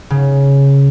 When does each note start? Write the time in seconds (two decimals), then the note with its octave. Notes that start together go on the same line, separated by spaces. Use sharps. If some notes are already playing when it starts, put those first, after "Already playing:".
0.10 C#3